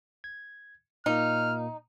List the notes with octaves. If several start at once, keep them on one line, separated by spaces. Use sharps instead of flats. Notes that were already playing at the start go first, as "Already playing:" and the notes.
G#6
A#2 A#3 D#4 F6